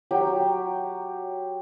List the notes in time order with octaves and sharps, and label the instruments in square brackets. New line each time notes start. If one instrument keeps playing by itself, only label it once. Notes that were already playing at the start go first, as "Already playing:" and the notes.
[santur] F#3 G4 G5